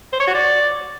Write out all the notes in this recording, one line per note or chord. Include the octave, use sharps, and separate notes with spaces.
C5
C#5
F#4
D5